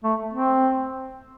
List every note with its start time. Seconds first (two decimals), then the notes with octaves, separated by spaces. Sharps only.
0.04 A3
0.33 C4